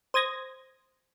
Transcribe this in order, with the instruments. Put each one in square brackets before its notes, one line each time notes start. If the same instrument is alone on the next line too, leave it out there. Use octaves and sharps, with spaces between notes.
[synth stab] C5 D#6 G#6 A#6